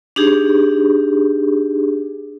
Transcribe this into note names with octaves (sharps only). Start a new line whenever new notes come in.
D4 D#4 G4 G#4